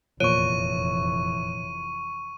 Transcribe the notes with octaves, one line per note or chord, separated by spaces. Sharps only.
F1 E2 A#2 E3 F3 C#5 C#6 D#7